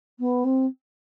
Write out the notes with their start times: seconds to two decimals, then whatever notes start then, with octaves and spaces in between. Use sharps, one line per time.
0.19 B3
0.44 C4